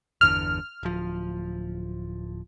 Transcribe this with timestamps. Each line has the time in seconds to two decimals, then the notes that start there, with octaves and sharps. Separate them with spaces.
0.21 G1 E2 D3 F6
0.83 D1 F3